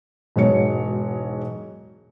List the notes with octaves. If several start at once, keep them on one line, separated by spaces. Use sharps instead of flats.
E1 G#2 F#3 C#5 C#7